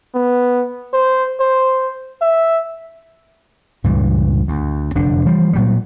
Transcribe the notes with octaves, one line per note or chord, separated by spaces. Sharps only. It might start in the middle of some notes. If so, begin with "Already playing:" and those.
B3
C5
C5
E5
C#2 G2 A#2 E3
D2
F1 F#2 D3 D4
E3 F3 G3
A#2 F#3 G3